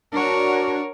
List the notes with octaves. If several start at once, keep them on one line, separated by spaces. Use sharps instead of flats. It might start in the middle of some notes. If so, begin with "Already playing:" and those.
D4 F#4 A#4 C#5